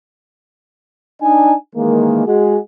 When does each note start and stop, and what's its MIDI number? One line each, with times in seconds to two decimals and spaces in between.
1.22 1.54 62
1.22 1.54 63
1.22 1.54 80
1.75 2.26 51
1.75 2.26 52
1.75 2.26 56
1.75 2.26 58
2.27 2.58 56
2.27 2.58 66
2.27 2.58 68